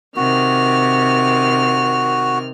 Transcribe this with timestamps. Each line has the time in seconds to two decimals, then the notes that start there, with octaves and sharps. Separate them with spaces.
0.16 C3 D#3 F#4 F6